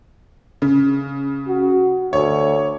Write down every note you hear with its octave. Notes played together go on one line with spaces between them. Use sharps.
C#3
F#4
D2 C#5